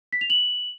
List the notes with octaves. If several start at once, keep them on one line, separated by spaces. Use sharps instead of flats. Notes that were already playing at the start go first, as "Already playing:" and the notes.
B6
F7
F#7